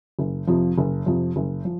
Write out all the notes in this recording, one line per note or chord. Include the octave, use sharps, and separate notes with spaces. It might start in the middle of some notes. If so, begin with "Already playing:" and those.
F#1
F2 C3 F3
F#1
F2 C3 F3
F#1
F3